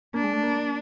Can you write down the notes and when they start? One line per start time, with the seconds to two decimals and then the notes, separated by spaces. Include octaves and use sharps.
0.14 A#3 D4
0.24 G#3
0.33 A3
0.43 A#3